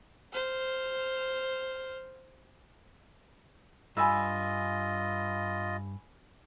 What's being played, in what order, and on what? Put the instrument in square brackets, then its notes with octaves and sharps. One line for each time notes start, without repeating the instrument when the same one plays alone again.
[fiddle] C5 F6
[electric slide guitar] G2 [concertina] F4 D#5 [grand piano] G#5 B5 E6